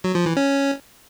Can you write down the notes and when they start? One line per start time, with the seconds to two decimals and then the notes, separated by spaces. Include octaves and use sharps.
0.04 F#3
0.15 F3
0.26 E3
0.37 C#4